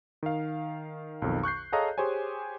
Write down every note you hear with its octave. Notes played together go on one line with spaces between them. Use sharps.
D#3 F5
B1 F2 D#3
C#6 F#6 G6 C7
G#4 A4 C#5 D#5 F5 A#5
G4 G#4 C5 C#5 G#5